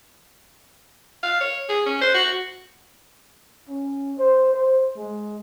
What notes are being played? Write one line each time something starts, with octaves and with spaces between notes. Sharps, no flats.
F5
C#5
G#4
C#4
C5
F#4
C#4
C5
C5
G#3